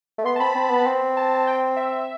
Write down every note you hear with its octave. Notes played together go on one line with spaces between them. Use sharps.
A3
B3 C6
A5
C4 B5
C4
B3
C4
A5
G5
E5